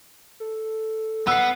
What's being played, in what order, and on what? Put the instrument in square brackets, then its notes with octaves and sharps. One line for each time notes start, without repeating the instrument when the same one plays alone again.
[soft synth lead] A4
[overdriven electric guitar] B3 [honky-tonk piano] E6 C7 [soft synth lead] F#6